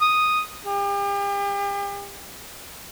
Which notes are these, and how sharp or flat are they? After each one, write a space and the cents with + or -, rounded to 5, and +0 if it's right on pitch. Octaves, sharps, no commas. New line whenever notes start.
D#6 +0
G4 +40